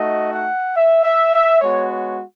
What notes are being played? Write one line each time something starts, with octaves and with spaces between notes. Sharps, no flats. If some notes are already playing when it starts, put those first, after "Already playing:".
Already playing: A3 D#4 F#4 D#5
F#5
E5
E5
E5
G#3 B3 F#4 C#5
C#5